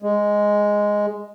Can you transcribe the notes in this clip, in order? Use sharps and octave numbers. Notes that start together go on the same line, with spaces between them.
G#3